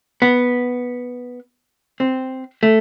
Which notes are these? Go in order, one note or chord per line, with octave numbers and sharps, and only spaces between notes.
B3
C4
A3